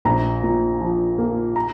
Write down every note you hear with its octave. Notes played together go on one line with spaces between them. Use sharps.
A#1 A#5
A#2
F3
A#3
A#5